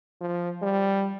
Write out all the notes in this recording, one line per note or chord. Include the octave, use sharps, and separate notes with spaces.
F3
G3